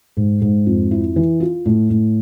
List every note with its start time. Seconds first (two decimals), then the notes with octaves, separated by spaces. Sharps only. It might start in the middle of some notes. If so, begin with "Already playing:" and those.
0.17 G#2
0.42 G#2
0.67 F2
0.91 E4
1.16 E3
1.40 F4
1.66 A2
1.90 A2